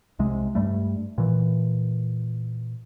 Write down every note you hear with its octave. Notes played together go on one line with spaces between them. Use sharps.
C2 C3 G#3
G2 G3 A3
A#2 E3